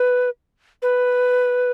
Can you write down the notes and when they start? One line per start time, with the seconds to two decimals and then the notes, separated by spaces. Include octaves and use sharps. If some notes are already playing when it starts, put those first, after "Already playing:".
Already playing: B4
0.82 B4